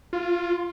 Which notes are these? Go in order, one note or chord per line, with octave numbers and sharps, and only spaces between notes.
F4